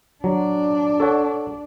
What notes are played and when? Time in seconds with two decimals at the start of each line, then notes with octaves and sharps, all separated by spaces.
0.24 F#3 D4
1.00 A4 C#5 F#5